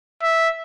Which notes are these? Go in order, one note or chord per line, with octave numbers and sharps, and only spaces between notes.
E5